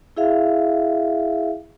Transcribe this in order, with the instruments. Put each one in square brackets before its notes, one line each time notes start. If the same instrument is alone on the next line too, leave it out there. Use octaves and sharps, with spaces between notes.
[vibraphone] E4 G#4 E5 F5